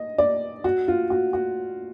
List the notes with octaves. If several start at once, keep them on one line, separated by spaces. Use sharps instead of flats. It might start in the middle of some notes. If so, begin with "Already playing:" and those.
Already playing: D#5
D5
F#4
F4
F#4
F#4